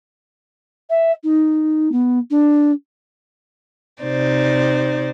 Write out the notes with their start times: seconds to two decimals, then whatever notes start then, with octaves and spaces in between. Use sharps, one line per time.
0.90 E5
1.24 D#4
1.92 B3
2.31 D4
4.03 C3 D#4 C5 D5